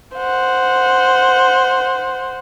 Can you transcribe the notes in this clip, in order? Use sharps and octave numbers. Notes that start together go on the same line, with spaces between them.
C5 F#5